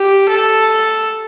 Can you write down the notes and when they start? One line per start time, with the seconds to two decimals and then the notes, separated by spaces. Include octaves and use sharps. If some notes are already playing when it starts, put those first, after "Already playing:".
Already playing: G4
0.29 A4